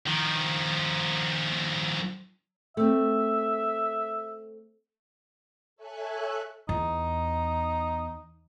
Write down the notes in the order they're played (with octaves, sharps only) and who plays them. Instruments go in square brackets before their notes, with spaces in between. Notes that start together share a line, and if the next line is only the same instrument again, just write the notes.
[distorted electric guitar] D#3 F3
[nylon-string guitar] A3 C4 [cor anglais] E5
[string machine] A4 C#5 E5 G#5 F#6
[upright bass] E2 [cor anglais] D#4